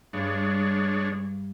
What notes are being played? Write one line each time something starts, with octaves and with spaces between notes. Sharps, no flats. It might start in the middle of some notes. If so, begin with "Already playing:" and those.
G2 G#3 D4 C#5